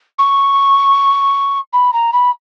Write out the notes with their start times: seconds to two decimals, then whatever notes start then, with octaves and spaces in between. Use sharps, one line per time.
0.19 C#6
1.73 B5
1.93 A#5
2.13 B5